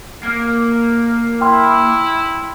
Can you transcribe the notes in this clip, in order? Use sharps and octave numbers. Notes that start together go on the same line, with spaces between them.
A#3
E4 G5 C6 F6